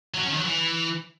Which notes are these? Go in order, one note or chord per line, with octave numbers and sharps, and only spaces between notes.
F#3
C#4
D#3
F#3
E3